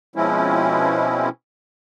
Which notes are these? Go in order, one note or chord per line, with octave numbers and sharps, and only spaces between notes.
B2 F3 G#3 C4 C#4 E4